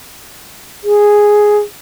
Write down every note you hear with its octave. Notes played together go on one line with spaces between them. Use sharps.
G#4